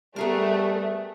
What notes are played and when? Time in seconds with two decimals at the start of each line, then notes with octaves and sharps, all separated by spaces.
0.16 G3 A3 B3 G#4 A#4